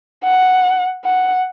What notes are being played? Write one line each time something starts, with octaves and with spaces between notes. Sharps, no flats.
F#5
F#5